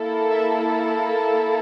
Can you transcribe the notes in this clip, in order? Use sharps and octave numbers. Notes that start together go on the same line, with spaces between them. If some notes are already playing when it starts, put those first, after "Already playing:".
Already playing: A#3 E4 A4
E5